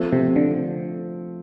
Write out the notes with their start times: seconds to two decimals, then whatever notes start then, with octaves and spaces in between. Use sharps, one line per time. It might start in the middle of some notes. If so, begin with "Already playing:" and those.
Already playing: F3 A3 C4
0.12 C3
0.36 D3